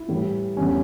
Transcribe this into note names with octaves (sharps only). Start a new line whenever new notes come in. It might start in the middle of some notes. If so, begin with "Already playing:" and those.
Already playing: E4
A2 E3 G3
E2 D3 G3 C#4